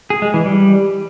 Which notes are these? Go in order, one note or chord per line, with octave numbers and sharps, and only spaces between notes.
G#4
G#3
E3
G3